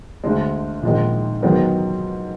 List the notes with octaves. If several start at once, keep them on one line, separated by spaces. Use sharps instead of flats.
D2 D3 G#3
A#1 G#2 D#3 G#3
G#2 D#3 F#3 B3 D#4